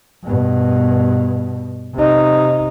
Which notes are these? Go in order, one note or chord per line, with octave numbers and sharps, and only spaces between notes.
G2 B2
C3 D#4